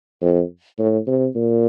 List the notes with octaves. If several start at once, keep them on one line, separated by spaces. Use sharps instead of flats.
F2
A2
C3
A#2